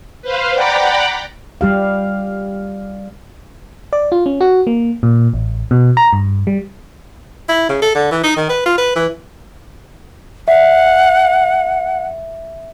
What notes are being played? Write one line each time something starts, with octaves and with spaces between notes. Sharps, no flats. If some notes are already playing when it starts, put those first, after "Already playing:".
B4 C5 F5
D5 F#5 G5 A#5 B5 D6
G3 G4 F5
D5
F4
C#4
F#4
A#3
A#2
A1
B2
A#5
G2
G3
E4
C#3
A4
D3
E3
D#4
D#3
B4
F4
B4
E3
E5 F#5